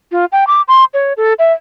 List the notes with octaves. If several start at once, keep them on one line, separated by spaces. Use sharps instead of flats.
F4
G5
D6
C6
C#5
A4
E5